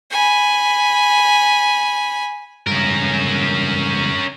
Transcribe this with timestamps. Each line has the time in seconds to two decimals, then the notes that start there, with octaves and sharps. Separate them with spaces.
0.11 G#5 B5
2.67 C#2 G2 C#4 A#4